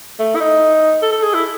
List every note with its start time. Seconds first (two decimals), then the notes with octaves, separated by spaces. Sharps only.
0.19 A3
0.35 E4
0.40 D#4
1.02 A4
1.12 A4
1.23 G#4
1.34 E4